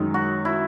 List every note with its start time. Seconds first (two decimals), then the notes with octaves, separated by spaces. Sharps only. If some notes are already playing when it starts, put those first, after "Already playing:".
Already playing: F#2 D#3 G#3 D#4
0.14 F#4
0.45 E4